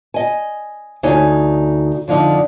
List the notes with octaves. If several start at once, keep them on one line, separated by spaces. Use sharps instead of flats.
D#5 G#5
D2 D#4 C#5 G#5
F2 D3 F3 D#4